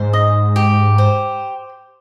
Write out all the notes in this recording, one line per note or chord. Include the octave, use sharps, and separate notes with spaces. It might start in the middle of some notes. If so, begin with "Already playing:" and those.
Already playing: G#2 C5
D#5
G4
C5